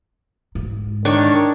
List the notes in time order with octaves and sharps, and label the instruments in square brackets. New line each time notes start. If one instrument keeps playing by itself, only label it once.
[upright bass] G#2
[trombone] D#3 [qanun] D4 C#5